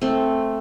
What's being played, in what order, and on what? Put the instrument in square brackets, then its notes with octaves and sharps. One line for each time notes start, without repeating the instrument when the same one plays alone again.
[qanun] A3 C4